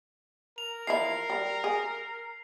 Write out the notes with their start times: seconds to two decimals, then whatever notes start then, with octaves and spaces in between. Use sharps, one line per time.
0.58 A#4 F7
0.87 E3 F3 E4 C7
1.30 G3
1.64 G#4